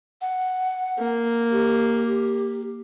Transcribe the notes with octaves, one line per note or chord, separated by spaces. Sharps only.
F#5
A#3
G4